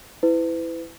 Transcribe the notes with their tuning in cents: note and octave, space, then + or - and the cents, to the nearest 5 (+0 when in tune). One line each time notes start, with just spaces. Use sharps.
E4 +0 B4 +35